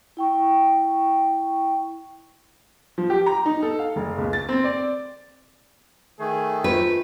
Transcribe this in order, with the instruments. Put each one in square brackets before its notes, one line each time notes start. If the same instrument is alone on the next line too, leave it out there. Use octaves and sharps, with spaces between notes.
[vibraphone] E4 G5 C#6
[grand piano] F3
G4
A#5
D#4
A4
F5
F#1
C#2
A6
C4
D5
[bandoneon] D#3 A3 [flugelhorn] G#4
[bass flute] F4 [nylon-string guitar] B4 [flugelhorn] C5